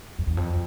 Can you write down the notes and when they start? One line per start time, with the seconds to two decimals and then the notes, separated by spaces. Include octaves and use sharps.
0.19 F2
0.27 E2
0.37 F2